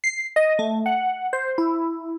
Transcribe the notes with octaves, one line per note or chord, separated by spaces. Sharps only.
C7
D#5
A3
F#5
C5
E4